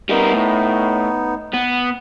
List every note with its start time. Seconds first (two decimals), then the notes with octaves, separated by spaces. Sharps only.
0.09 G3 B3 D#4 A#4
0.32 A2
1.54 B3